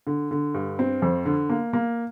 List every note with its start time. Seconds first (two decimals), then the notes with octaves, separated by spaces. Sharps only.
0.07 D3
0.31 D3
0.54 G2
0.79 C4
1.02 F2
1.26 D3
1.49 A#3
1.73 A#3